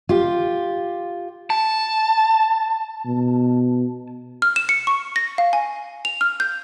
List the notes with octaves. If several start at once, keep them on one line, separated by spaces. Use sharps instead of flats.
F4 G4
A5
B2
F6
E7
C#7
C#6
A#6
F5
G#5
F7
F6
G6